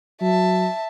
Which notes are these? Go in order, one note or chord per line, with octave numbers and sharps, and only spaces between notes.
F#3 E5 A5